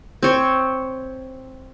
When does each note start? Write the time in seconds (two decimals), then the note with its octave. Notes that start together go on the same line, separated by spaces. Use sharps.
0.23 C4 C#5